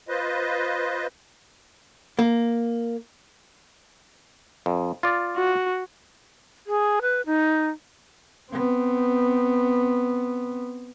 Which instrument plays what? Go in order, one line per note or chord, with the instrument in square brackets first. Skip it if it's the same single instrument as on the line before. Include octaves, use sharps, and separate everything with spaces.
[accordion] F4 B4 C5 D#5
[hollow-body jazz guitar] A#3
[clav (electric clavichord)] F2
F4 D5
[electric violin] F#4
[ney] G#4
B4
D#4
[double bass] B3 C4